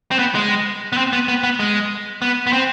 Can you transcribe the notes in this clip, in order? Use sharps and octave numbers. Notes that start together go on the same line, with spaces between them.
C4
B3
G#3
B3
C4
B3
B3
B3
G#3
B3
B3
C4